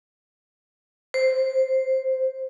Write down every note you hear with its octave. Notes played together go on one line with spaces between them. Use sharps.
C5